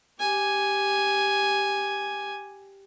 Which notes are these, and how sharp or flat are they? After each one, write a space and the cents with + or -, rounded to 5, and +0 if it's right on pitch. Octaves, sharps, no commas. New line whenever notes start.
G4 +0 G#5 +0